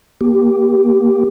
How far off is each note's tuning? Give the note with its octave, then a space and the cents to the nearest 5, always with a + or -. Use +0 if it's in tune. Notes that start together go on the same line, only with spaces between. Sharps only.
A#3 +25 G4 +0